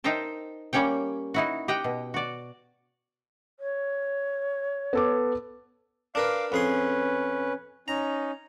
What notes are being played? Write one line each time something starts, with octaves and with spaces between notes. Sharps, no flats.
D#4 A#4 C5 E5 G5 A5
G3 A#3 C#4 C#5 G5
D#4 E4 F#4
G4 D#5 F#5 G5
B2
F#4 D5
C#5
B3 A4 D6
D4 A#4 B4 F5 D6
F2 C#4 G#4 B4 C6
C#4 D#4 A#5